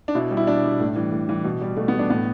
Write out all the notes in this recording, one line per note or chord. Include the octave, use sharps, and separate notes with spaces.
D4
B2 E4
G3
E4
B2 D4
G3
A2
E3 G3
A2
E3 G3
B2
G3
B2 A3
B3
G3 D4
A2 B3